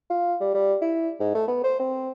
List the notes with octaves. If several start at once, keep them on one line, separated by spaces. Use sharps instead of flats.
F4
G3
G3
E4
G#2
A3
B3
C5
C4